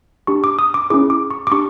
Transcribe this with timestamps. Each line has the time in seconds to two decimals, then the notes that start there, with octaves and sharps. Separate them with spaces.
0.27 D4 G4 C#6
0.44 D6
0.59 D#6
0.74 D6
0.90 C#4 E4 G#4 D6
1.10 D6
1.31 C#6
1.47 D6
1.51 D4 G4 C#6